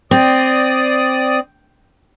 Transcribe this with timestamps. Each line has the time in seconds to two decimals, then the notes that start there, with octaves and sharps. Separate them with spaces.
0.11 C4 D5 D#6